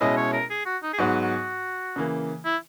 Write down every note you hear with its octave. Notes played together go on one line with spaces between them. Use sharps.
B2 G#3 C#4 E4 D#5
C#5
A#4
G#4
F#4
D#4
G#4
G#2 F#3 B3 F#4
F#4
C#3 E3 A#3
E4